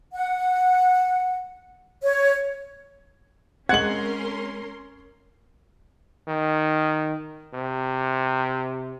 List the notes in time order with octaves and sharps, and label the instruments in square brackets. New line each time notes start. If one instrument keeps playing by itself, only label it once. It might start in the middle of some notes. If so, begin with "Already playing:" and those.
[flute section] F#5
C#5
[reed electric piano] G#3 C4 [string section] C#4 A#4 C6 [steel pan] F#5 [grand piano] G#6 F#7
[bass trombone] D#3
C3